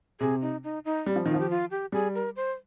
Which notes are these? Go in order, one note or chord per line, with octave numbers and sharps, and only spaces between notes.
C3 G#4
D#4
D#4
D#4
G3
F3
D#3 F4
F3
G4
F4
G4
G3 G#4
A#4
C5